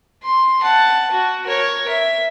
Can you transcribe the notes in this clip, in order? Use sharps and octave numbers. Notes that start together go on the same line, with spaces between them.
C6
F#5 A5
F#4
A#4 C#5
E5